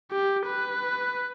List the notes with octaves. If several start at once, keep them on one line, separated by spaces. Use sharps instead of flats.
G4
B4